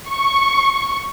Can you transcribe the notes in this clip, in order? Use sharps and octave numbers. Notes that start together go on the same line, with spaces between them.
C#6